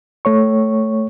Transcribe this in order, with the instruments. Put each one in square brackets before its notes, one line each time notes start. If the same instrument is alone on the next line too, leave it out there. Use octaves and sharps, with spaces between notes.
[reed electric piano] A3 C#5 C#6